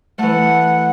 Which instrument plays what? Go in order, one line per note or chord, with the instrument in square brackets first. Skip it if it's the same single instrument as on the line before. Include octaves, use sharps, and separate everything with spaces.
[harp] E3 A3 [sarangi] F#5